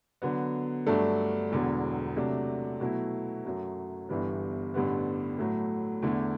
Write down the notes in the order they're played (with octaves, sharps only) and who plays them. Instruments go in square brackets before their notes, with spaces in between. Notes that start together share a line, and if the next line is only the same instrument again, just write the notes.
[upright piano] D3 F#3 B3
G2 F#3 A3 D4 A4
E1 E2 D3 F#3
C3 F#3 A3 D4
B2 F#3 A3 E4
F#2 F#3 A3
G1 G2 E3 G3 B3
A1 G2 D3 G3 B3
A2 F#3 A3
E2 D3 A3